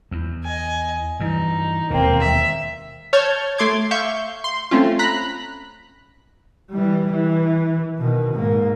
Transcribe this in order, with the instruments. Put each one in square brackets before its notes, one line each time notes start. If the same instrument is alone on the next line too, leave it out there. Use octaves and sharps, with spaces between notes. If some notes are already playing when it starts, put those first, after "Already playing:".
[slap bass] E2
[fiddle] D#5 G#5
[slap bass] G2 E3 [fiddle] D#4
[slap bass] E1 D#2 [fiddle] A#3 C4
[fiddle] E5
[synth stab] C#5 A5 F6 G6 G#6
A3 C6 D6 G#6
E5 F5 C#6 G6
C6
A3 C4 C#4 F4
A#5 B5 F#6 B6
[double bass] E3 G3
E3
B2 D#3
G#2 A#3